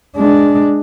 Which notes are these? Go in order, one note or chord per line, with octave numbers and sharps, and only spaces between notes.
G#3 D4